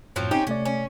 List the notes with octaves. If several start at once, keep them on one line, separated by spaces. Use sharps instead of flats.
F#2 A2 F3 F#3 C4
C4 C#4 D#4 G4
C3 A3 C#4 D5
C#4